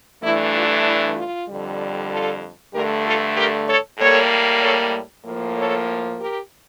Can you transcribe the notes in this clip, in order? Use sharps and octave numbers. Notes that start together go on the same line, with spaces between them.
G2 E3 A3 D4 E4
F4
E4
F4
F2 D3 G3
F4 A4
G2 D3 A3 G4 A#4
F4 A4
G4 A#4
A4 C#5
A2 G3 A#3 A4 C#5
A4 C#5
A2 F3 A#3
A4 C#5
G4 A#4